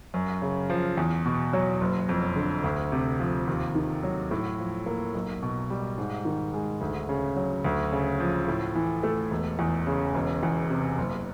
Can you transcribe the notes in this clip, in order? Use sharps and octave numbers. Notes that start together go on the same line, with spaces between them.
F#2
C#3
F3
E2
B2
F#3
F#1
F2
D3
D2
C3
F3
D#2
D#3
F#3
A2
F3
A#3
B1
B2
G3
G#2
D#3
G#3
D2
C#3
F#3
D2
C#3
F3
A2
E3
A3
E1
E2
C#3
E1
E2
C3
F#1